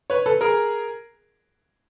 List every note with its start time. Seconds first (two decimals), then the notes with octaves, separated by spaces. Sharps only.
0.10 B4 C#5
0.26 A4 B4
0.41 G#4 A#4